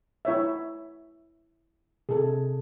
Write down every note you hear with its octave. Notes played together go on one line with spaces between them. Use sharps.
E4 C#5 E5
C3 G#4 A4